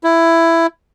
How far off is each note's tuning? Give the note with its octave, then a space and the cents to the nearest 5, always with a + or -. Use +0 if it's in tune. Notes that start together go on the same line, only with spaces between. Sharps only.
E4 +10